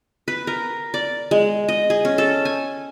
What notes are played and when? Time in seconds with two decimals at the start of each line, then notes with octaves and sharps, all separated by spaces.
0.28 B4
0.47 A#4
0.94 D5
1.31 G#3
1.69 D#5
1.90 G#4
2.05 C#4
2.18 A4
2.45 G#5